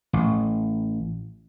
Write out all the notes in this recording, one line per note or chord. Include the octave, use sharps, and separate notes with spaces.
A1